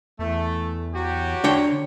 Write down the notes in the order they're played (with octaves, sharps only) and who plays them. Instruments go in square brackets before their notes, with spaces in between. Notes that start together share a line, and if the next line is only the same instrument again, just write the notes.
[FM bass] E2 [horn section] A3
[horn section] F#3 F#4 G4
[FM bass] D3 [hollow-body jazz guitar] D4 C#5 G5